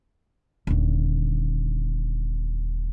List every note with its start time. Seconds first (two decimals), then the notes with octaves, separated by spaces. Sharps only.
0.67 D#1 D3